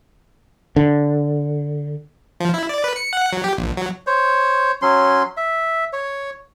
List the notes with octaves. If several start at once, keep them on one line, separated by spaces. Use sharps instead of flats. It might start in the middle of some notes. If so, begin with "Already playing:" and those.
D3
F3
E4
D5
B4
C#7
F#5
F#3
G4
A#1
F#3
C5 C#5
F#3 C#4 C6
E5
C#5